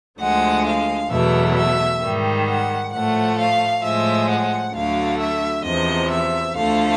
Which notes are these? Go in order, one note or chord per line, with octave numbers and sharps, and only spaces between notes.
D2 D3 F3 G#3 F#5
F5
E2 B2 F#3 A3 E5
E5
G#2 D#3 G3
F#5
A2 F3 A3 F#5
F5
A2 F3 G#3 E5
F#5
D2 D3 F#3 A3 F5
E5
E2 C3 F3 D#5
E5
D2 D3 F3 A3 F5